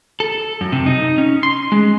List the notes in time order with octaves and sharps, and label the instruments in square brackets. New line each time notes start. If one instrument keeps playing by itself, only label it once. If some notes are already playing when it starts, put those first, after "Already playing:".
[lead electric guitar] A4
F#2
C3
D#4
C#4
C6
G#3